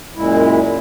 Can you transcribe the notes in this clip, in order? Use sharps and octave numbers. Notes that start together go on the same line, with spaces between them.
F#2 A#2 G#3 E4